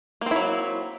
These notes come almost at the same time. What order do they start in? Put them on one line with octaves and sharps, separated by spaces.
A#3 C4 E4 F#3